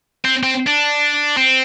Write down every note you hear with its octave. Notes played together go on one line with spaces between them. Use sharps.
C4
C4
D4
C4